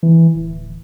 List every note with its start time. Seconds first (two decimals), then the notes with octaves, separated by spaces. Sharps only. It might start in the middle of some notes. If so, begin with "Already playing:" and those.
0.03 E3
0.35 D1